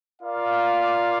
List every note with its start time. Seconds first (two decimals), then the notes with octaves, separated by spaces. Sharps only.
0.21 F4 A#4 D5 F5